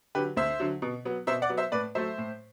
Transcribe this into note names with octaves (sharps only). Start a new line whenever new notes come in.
D3 F#3 G4 B4
D2 C5 E5
D3 F#3
B2
F#3 B3
B2 C5 E5
D5 F#5
F#3 B3
C5 E5
A2 B4 D5
F#3 A3 C5 E5
A2